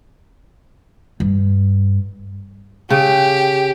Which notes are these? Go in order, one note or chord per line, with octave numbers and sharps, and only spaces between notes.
G2
C#3 G4 G5